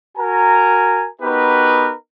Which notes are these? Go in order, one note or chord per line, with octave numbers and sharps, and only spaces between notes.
F#4 A#4 G#5 A#5
B3 D#4 F#4 G4 A#4 B4